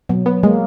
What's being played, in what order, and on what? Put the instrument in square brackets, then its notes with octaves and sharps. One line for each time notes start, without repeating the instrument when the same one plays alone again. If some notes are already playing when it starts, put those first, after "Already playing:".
[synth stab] B2 [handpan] F#3
[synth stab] B3
[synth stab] G#3 [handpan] A#3